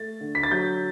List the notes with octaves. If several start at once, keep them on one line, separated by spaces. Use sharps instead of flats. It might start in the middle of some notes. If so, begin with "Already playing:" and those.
Already playing: A3 A6
D3
B6
A6
F#3 G6